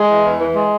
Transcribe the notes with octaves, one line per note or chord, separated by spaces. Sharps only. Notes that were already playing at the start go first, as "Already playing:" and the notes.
Already playing: G#3
E3
E2
E3
G#3